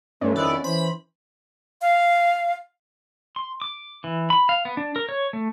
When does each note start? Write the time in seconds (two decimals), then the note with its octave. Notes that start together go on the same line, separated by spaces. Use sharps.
0.21 G2 A3 C#4
0.36 F2 D#3 B3 E4 D5
0.64 E3 C5 B5
1.81 F5
3.36 C6
3.62 D6
4.04 E3
4.30 B5
4.49 F5
4.65 B3
4.77 D4
4.96 A#4
5.09 C#5
5.33 A3